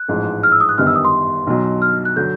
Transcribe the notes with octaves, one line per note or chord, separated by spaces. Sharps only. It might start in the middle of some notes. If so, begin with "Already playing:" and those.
Already playing: F#6
A1 G#2 F3 G#3
F6
E6
D#6
F#6
G1 F#2 D#3 G3 B3 F6
E6
D#6
C6
B1 B2 F#3
F6
F#6
D3 F#3 G6